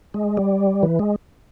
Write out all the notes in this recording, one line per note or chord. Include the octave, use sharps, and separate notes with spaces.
G#3
G3
E3
G#3